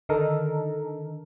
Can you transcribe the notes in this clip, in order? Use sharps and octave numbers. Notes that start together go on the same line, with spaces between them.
D3 D#3 D#4 A4 A#4